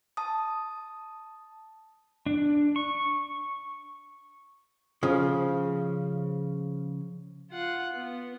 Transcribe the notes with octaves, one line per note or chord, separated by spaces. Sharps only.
A5 D#6
D4
C#6
C#3 F3
F4 F#5
B3